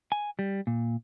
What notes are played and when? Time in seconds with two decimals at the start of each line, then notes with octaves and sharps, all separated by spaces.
0.12 G#5
0.39 G3
0.67 A#2